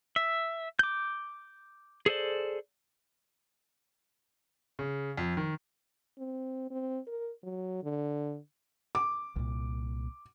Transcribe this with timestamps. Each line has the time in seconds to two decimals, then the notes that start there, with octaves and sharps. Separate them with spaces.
0.16 E5
0.79 D6 G6
2.06 G#4 A4 C5 D5
4.79 C#3
5.18 F2
5.37 D#3
6.18 C4
6.70 C4
7.07 A#4
7.43 F#3
7.83 D3
8.95 D6
9.36 C2 A#2